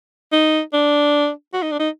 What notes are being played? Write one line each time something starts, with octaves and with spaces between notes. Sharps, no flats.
D#4
D4
F#4
D#4
D4
D#4